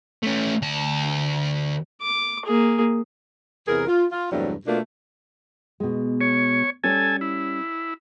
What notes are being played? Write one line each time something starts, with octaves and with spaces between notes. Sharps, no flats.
A3 C#4
D2 A5
D6
A#3 G#4
E2 C3 G#4 A#4
F4
F4
E2 G2 C3 F#3 G3 A3
B2 A3 A#3 D4 F4
B2 G#3
C#5
G3 C#4 A4 C#5 G#5
E4